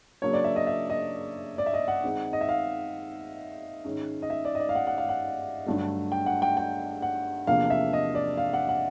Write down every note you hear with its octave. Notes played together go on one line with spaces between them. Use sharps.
C#3 F#3 A#3 D4 C#5
D5
E5
D#5
E5
D#5
D5
E5
D#5
F#5
D#3 G#3 C4 D#4
D#5
E5
F5
G#2 D#3 G#3 C#4
D#5
E5
D5
D#5
D5
F5
F#5
F#5
F5
F#5
G2 D3 F#3 A3
G5
F#5
G5
G5
F#5
E2 C3 F3 A#3 D4 F5
E5
D#5
D5
F5
F#5
F#5